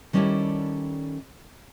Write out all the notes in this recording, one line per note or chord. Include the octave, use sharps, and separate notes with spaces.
D#3 G3 C#4 E4 A4 D5